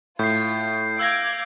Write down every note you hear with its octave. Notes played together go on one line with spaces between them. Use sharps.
A2 F4 G6 C7
F5 D6 E6 G6 G#6 A#6